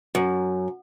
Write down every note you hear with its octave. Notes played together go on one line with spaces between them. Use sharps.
F#2